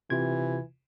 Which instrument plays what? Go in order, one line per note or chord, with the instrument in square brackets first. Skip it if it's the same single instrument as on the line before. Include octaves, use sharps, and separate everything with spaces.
[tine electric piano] C3 F4 G#6 [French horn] E3